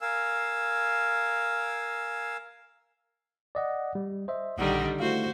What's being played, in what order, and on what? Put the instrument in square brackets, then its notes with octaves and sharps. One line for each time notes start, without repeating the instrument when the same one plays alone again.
[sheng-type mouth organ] A#4 F5 G#5 E6
[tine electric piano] D5 D#5 F#5
G3
C5 D#5 E5
[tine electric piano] A#1 F#5 [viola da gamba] D3 D#3 G3
[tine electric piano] A3 E4 F5 [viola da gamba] F#4 C5